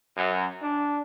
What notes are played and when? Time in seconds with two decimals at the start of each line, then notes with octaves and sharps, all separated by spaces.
0.15 F#2
0.61 D4